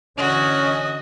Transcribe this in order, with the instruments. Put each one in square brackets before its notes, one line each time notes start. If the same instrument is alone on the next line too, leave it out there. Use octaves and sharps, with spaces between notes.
[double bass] D3 E3 [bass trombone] C#4 [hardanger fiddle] F#4 [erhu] D#5